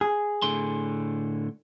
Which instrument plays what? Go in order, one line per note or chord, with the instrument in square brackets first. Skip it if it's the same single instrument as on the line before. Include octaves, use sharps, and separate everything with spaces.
[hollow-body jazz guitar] G#4
[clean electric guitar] A2 D3 C6